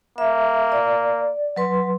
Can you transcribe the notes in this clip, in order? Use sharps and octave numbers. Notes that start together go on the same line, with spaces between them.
A#3 E5
D5
F#3 B4 C6